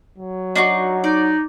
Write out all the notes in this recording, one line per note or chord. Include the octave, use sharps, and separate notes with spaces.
F#3
D4 D#4 F#4
D#4 D5